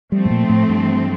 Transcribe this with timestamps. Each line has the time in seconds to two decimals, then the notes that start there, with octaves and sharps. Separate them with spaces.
0.12 F3 G3 A3 C4
0.25 A2
0.30 A#2
0.49 A2
0.69 G2